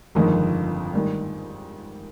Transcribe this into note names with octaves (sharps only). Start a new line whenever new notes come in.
G1 F2 D#3 G#3
G#2 D#3 G3